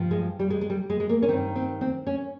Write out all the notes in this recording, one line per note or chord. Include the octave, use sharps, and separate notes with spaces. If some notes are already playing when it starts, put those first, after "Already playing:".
Already playing: G2 F3
G#3
G3
G#3
G#3
G3
G#3
G#3
A#3
C#4
G2 D#3 C4
C4
C4
C#4